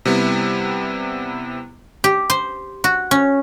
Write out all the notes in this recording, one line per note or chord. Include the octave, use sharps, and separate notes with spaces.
C3 G3 B3 E4
G4
C5
F#4
C#4